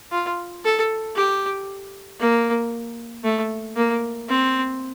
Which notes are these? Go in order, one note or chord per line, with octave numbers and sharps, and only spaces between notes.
F4
A4
G4
A#3
A3
A#3
C4